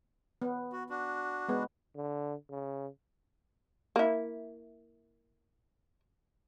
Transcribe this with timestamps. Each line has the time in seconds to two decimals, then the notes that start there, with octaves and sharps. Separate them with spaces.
0.42 B3
0.73 F#4
0.90 D4 F#4
1.49 G#3 B3
1.96 D3
2.50 C#3
3.96 A#3 E4